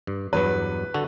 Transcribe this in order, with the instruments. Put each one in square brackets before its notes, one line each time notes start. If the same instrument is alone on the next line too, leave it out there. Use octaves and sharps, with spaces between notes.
[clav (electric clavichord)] G2
[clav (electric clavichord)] E2 G2 F#3 [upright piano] B4
[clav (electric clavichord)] D3 F#4 A4